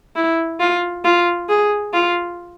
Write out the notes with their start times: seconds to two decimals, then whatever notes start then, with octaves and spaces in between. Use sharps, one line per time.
0.16 E4
0.60 F4
1.04 F4
1.49 G#4
1.93 F4